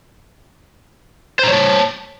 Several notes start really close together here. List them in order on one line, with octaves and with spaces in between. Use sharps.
C5 A#5 C#5 A5